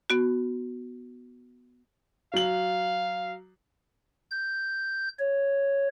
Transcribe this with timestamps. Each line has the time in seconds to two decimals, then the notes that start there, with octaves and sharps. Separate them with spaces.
0.10 B3 F#4
2.34 F#3 F5 F#7
4.30 G6
5.19 C#5